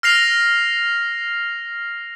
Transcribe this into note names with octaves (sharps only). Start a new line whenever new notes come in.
F6 A#6 C7 F7